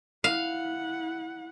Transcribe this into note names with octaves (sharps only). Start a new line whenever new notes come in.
E4 F5 F#5